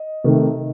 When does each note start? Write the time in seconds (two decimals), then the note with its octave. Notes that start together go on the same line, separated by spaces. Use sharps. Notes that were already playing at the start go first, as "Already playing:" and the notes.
Already playing: D#5
0.24 C3 D#3 A3